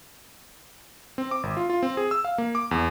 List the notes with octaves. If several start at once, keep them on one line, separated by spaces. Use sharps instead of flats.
C4
D6
G#1
F4
F4
C4
G#4
E6
F5
A#3
D6
E2